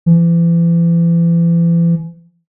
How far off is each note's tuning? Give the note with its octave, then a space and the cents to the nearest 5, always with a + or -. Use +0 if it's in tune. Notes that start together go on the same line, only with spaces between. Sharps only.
E3 +40